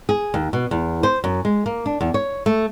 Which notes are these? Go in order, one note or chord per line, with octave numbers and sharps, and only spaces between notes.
G#4
D#2
B2
E2
C5
F#2
G#3
A#3
D4
E2
C#5
A3